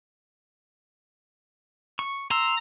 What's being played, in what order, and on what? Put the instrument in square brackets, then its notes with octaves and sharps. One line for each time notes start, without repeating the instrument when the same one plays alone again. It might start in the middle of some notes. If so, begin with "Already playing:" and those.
[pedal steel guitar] C#6
[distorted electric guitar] A#5 [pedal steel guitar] C6 E6